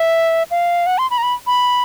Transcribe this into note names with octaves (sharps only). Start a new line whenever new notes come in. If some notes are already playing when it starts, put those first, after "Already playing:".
Already playing: E5
F5
F#5
C6
B5
A#5
B5
B5